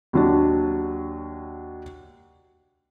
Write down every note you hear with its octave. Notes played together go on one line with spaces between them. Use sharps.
D#2 F#3 D4